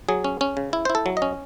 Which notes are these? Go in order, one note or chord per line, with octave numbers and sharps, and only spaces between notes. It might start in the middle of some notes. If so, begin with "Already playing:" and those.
F#3 G#4
C#4
C#4
C#3
E4
E4 C5
A4
F#3
D#5
C#4